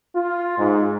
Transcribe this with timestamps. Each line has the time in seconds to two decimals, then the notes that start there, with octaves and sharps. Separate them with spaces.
0.14 F4
0.57 G#2